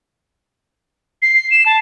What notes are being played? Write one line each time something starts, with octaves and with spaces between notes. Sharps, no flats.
C7
E7
A5